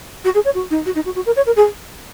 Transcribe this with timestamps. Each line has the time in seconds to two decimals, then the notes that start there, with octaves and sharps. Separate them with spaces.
0.24 F#4
0.34 G#4
0.45 C#5
0.55 F#4
0.70 D#4
0.86 F#4
0.95 D#4
1.05 F#4
1.15 F#4
1.26 A#4
1.36 C#5
1.46 A#4
1.56 G#4